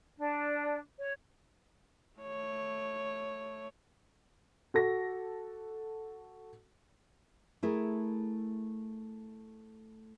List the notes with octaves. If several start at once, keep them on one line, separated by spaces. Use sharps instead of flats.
D4
C#5
A3 C#5
F#4 A4 A#6
A3 E4 G#4 A#4